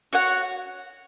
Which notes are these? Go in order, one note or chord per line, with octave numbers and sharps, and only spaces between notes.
F#4 C#5 F#5